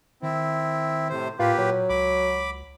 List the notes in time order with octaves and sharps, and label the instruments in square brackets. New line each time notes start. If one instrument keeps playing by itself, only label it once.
[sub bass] D#3 [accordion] C4 E4
[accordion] A2 C3 C5
[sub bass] A2 [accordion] A#3 G4 B4 [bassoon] F4
[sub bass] A#2 [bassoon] F#3
[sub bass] C#2 [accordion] B5 D6